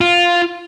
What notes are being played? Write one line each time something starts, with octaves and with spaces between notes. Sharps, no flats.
F4